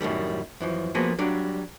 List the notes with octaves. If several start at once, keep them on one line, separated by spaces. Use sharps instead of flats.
F#2 A2 D#3 G3
F#2 E3 F3
F3 A#3 B3 F#4 G#4
F#3 G3 D4 D5